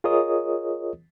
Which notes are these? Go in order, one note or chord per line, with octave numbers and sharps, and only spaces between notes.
F4 G#4 A#4 C#5 D#5 D#6